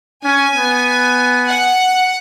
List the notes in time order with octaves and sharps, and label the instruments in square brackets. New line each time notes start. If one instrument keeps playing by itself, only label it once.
[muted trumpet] C#4 [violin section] G#5
[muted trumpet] B3
[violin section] F#5